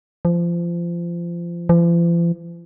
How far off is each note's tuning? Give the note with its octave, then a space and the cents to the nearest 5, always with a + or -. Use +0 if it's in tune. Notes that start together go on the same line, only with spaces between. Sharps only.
F3 -25
F3 -45